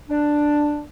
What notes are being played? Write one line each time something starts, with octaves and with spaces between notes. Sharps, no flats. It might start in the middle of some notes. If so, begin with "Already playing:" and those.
D4